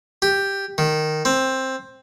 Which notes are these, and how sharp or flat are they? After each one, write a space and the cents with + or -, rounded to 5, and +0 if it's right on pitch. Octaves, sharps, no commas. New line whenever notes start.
G4 +5
D#3 -10
C4 +10